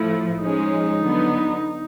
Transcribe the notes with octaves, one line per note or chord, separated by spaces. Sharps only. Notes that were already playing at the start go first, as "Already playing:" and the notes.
Already playing: A2 F3 A3 E4
F3 G#3 C#4 D#4
D3 F#3 B3